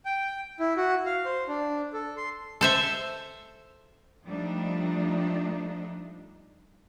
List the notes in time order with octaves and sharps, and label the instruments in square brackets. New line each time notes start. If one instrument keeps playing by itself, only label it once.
[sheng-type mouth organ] G5
E4
F#4
F5
C5
D4
A4
C6
[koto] A4 C5 E5
[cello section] F3 G3 A3 D4 D#4